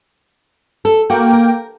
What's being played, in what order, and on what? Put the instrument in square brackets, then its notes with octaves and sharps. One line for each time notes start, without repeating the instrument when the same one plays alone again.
[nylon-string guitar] A4
[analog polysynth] A#3 G5 [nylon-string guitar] F#4
[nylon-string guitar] A#4